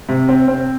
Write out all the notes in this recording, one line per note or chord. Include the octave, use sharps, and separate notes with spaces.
C3
C4
C4